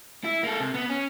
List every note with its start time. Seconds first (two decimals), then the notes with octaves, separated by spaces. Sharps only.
0.24 E4
0.43 A#3 A4
0.60 C3
0.74 B3
0.89 C#4